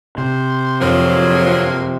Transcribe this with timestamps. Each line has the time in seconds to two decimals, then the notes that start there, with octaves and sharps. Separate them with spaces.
0.18 C3 C5
0.81 F2 D3 F3 F#3 A#3